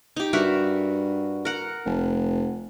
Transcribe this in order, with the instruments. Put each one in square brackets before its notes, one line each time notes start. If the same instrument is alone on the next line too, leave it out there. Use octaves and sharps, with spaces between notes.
[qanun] D#4 G4
[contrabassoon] G2 [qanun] F#4 A#4 E5
[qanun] A#4 F#5
[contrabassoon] F1